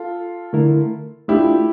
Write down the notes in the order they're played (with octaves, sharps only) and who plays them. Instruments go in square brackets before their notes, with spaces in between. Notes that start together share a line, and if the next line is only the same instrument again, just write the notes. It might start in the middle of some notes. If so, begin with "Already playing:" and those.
Already playing: [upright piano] F4 A4
[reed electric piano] D3 A3 E4 A#4
[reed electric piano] A3 D4 F4 [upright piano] E4 G4